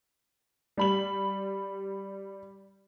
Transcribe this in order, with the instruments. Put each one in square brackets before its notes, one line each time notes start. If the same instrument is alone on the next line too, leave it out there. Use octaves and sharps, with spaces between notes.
[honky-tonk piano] G3 B5 F#7